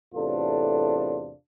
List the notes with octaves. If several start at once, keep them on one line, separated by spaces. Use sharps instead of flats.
E2 A2 C3 D4 F4 A4